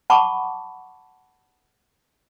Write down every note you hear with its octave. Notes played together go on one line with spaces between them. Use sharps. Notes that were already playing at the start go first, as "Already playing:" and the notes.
F#5 A5 B5 C#6 D6